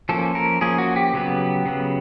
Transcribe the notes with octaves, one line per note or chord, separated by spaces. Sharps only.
F3 A#3 C#4 A4
A#4
F3 A#3 C#4 G#4
F#4
G4
C#3 F#3 B3
C#3 F#3 B3